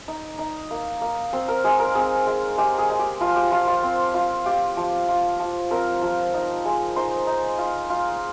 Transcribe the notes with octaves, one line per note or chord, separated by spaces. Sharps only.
D#4
D#4
A#3
A#3
C4 C5
A#4
G#3 G#4
A#4
C4 G#4
G#3
G#3 G4
G#4
G#3
G4
F3 F4
G4
F3 F4
F4
C4
F4
F4 G4
F3
F4
F3
C4 A#4
F3
D#4
G#3
D#4 C5
D#4
F4
F4